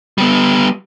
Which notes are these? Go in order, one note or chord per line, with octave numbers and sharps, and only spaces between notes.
G3 B3